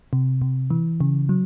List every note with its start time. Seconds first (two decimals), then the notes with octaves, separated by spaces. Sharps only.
0.13 C3
0.42 C3
0.71 E3
1.01 C#3
1.29 F#3